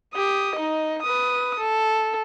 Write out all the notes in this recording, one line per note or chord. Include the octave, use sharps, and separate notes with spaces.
G4 D#6
D#4 D#5
B4 D#6
A4